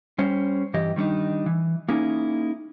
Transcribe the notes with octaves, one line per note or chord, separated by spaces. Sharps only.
G3 C#4 C5
G2 E3 G4 D#5
D#3 G3 A#3 D4 D#4
E3
A#3 C#4 D#4 E4 G#4